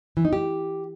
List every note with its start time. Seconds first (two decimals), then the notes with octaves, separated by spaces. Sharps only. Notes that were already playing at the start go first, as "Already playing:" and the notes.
0.17 E3
0.25 D#4
0.33 G4